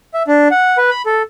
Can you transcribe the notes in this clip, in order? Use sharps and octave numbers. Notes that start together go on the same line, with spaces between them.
E5
D4
F#5
B4
B5
A4